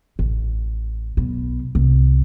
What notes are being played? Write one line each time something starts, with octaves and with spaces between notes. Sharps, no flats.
A1
B1 B2
C2